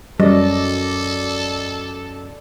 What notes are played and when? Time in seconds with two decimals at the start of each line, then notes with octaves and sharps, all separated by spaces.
0.20 F#2 G3 A4 D5 D#5